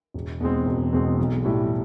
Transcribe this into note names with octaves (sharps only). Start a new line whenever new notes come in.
E1
E2 B2 G#3 C4
E1
E2 B2 G#3 C4
B1
A2 E3 G3